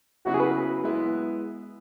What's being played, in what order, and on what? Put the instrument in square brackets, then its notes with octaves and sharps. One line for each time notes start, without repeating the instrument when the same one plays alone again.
[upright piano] C#3 F#3 B3 E4 [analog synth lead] F#4
[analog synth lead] G#4
B4
[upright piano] G#3 B3 E4 B4